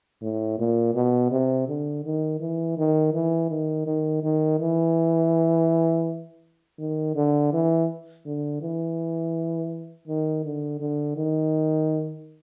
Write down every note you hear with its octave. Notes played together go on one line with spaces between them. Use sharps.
A2
A#2
B2
C3
D3
D#3
E3
D#3
E3
D#3
D#3
D#3
E3
D#3
D3
E3
D3
E3
D#3
D3
D3
D#3